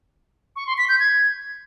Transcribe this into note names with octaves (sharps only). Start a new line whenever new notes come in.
C#6
C6
B6
G6
G#6